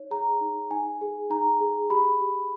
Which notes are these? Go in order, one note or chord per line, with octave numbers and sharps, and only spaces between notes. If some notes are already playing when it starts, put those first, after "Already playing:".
Already playing: D#4 C#5
G#4 A#5
D#4
D#4 G#5
G#4
D#4 A#5
G#4
G4 B5
G4